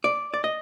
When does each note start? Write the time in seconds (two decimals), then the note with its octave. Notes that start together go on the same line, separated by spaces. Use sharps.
0.04 D5
0.34 D5
0.44 D#5